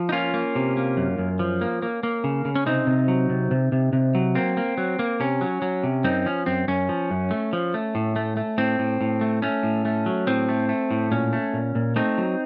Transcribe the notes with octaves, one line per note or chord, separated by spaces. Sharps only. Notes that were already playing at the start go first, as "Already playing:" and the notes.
Already playing: F3
D#4
A#3 C#4 F4
A#3
C3
A#3
F#2
F#2
F3
A#3
A#3
A#3
C#3
C#3
C#4
C3 C4 D#4
C3
F#3
C3
C3
C3
C3
F#3
A#3 C4
A#3
F#3
A#3
C3 C#4
F#3
F#3
C3
F#2 C4 D#4
F3 C#4
F#2 C4
F#2 C#4
F3
F#2
A3
F3
A3
A2
A3
A3
A2 C4
A2
A2
A3
A3 C#4
A2
A3
F#3
A2 C4
A3
A3
A2
A#2 C#4
A3
A#2
A#2
A3 C4 D#4
F#3